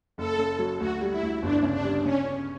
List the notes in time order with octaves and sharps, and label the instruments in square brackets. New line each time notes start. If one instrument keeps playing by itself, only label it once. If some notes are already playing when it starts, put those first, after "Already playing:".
[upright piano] F#1 [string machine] A4
[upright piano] C#3
F#3
[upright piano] D2 [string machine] F#4
[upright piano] G3
[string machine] E4
[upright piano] D2
[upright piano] G1 [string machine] D4
[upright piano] C#3
[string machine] D4
[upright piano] G3
[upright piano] C#3 [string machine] C#4
[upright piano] C#4